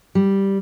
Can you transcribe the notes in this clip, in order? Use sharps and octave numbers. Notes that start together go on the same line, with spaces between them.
G3